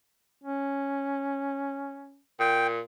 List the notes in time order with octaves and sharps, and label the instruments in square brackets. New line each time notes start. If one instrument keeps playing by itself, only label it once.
[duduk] C#4
[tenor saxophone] A#2 [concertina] G5